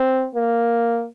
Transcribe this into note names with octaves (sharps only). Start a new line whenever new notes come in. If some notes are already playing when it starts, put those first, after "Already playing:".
Already playing: C4
A#3